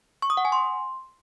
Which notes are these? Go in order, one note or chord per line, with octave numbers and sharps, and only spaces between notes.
C#6
D#6
F#5
G#5
C6